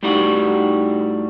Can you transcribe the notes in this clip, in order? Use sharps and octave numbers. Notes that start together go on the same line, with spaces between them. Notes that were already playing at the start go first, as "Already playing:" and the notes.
A2 G3 D#4 F#4